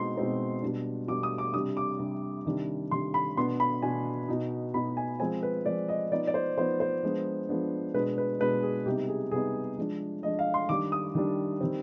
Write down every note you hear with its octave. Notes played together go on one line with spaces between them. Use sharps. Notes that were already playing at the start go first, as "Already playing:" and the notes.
Already playing: B2 G#3 C4 D#4 C6
B2 G#3 C4 D#4
B2 G3 D4
B2 G3 D4 D6
D#6
D6
C3 G3 D4 D#6
D6
C3 G3 D4
C3 D#3 G3 D4
C3 D#3 G3 D4 C6
B5
B2 B3 D4 C6
B5
B2 B3 D4 G#5
B2 B3 D#4
B2 B3 D#4 B5
G#5
F3 G#3 C4 G#5
B4
F3 G#3 C4 D5
D#5
F3 B3 D#4 D5
D5
C5
F3 B3 D#4 C5
C5
F3 G#3 B3 D4
F3 G#3 B3 D4
B2 G#3 D4 B4
B4
B2 G#3 D4 B4
G#4
C3 G3 B3 D#4 G4
G#4
C3 G3 B3 D#4 G#4
F3 G#3 D4
F3 G#3 D4 D#5
F5
C6
D#3 G3 D4 D6
D#6
D#3 G3 D4
D#3 G3 C4